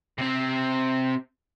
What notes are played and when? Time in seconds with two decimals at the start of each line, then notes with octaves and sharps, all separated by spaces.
0.18 C3 C4